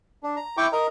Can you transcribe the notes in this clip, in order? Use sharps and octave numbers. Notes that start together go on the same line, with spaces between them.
D4
A#5
E4 G5 C#6 D6
A#4 D#5 A#5